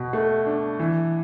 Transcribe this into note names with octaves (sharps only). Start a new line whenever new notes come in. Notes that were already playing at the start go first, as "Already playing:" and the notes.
Already playing: B2
A3
D4
E3